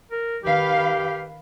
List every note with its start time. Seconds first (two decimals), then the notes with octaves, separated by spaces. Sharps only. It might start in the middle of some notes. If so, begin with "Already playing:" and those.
0.11 A#4
0.44 D#3 G4 B4 F5